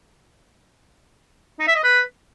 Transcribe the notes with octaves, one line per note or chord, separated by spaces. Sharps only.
D#4
E5
D#5
B4